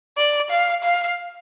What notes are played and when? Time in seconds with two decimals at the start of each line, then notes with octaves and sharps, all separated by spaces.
0.17 D5
0.50 F5
0.83 F5